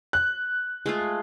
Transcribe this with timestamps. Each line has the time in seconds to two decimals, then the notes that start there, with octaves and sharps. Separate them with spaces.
0.13 F#6
0.86 G#3 A3 F4